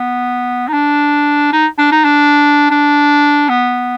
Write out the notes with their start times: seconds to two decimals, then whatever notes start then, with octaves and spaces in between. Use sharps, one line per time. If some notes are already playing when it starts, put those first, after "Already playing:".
Already playing: B3
0.68 D#4
0.73 D4
1.53 D#4
1.79 D4
1.92 D#4
2.05 D4
2.71 D4
3.49 B3